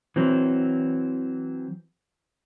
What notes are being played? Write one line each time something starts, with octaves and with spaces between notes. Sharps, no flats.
E3 F#3 C4